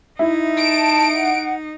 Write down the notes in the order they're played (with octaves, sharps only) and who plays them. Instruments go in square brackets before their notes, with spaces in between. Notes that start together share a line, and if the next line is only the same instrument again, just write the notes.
[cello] D#4 [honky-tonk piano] E4
[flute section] A5 [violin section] D7
[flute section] F#5